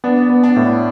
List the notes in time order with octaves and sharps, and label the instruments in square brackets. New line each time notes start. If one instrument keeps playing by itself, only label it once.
[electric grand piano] B3 [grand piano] D4
[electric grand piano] B3
[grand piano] D4
[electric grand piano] A2